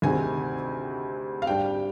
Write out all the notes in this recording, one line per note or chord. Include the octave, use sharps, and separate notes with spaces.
D2 C3 D#3 G#3 C4 G#5
F5
G#2 G3 D4 G5